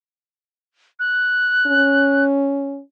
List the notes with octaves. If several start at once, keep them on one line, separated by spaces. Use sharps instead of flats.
F#6
C#4